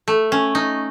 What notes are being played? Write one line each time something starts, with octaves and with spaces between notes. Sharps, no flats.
A3
C#4
D#4